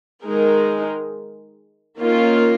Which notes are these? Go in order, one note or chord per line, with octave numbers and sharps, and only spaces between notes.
D#3 G#3 D#4 A#4
D#3 A#3 C#4 F4